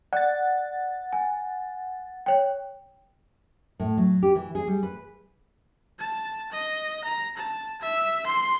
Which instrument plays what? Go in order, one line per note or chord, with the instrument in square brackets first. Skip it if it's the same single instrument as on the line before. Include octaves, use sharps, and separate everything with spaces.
[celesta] D5 [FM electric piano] F#5 A6
[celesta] G#5
C#5 G5
[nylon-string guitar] A2
F#3
G4
E3
G#4
G3
B4
[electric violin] A5
D#5
A#5
A5
E5
C6